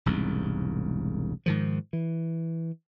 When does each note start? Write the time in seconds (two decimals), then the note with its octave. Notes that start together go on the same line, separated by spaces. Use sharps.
0.06 E1 C2 G#2
1.46 G#2 D#3 F3
1.93 E3